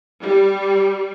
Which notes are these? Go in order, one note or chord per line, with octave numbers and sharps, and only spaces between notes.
G3